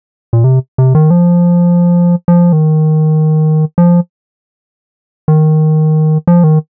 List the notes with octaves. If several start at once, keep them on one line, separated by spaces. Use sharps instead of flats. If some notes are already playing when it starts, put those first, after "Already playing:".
A#2
C3
C3
D#3
F3
F3
D#3
F3
D#3
F3
D#3